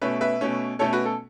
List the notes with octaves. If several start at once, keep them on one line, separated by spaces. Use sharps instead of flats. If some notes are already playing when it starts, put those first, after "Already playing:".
B2 A3 C#4 B4 E5
B4 E5
B2 A3 C#4
B2 A3 C#4 A4 C#5
F#4 B4
A4